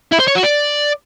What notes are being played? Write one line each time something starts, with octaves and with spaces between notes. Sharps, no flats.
E4
C5
C#5
F#4
D5